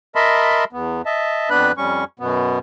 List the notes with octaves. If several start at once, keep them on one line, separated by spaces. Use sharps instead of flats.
A#4 D#5 E5 A5 B5 C6
E2 B3
D#5 E5 A5
F2 B3 D4 B4 B5 F#6
F2 G3 C#4 C#6
F#2 B2 B3